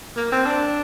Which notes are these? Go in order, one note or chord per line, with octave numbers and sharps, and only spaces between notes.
A#3
C4
D4